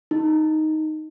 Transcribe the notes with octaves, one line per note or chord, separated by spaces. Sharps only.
D#4